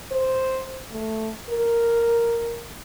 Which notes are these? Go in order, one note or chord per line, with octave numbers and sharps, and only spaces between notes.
C5
A3
A#4